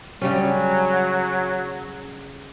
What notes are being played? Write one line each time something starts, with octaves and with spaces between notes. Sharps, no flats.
C#3 F#3 G3 C#4